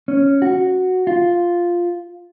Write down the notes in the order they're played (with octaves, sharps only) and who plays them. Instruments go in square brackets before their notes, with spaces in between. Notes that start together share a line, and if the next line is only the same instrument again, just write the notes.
[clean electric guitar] C#4
F#4
F4